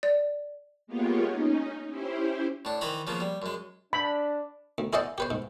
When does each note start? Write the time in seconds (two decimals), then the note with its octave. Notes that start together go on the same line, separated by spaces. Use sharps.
0.03 D5
0.87 G#3 A#3 B3 F4 G4 C#5
1.29 C#4 D#4
1.88 C#4 E4 G4 C5
2.65 A2 D4
2.81 D#3 E3 C5 A#5 B5
3.07 C#3 F3 A#3 B3
3.20 G3
3.42 F#2 G#3
3.93 D4 B5
4.78 D2
4.93 E4 G#4 C5 D5 D#5 F#5
5.18 G4 B4 C5
5.31 G#2